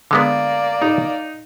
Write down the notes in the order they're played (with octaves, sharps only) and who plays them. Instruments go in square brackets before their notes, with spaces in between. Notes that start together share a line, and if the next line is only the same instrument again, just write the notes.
[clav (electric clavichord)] D3 G#3 B3 [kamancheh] A#3 D5
[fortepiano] D#4